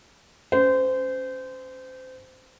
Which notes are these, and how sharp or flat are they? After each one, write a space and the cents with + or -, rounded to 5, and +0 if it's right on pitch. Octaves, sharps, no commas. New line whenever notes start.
C#4 +0 C5 -25